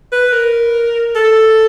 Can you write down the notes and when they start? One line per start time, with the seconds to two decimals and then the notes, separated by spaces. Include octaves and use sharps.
0.12 B4
0.33 A#4
1.15 A4